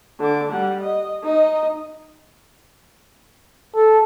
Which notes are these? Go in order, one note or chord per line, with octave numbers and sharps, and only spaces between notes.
D3 D6
G3 F#5
D#5
D#4 D#5
A4